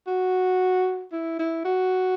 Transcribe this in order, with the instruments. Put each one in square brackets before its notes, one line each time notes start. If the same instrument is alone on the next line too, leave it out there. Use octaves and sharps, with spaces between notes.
[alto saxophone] F#4
E4
E4
F#4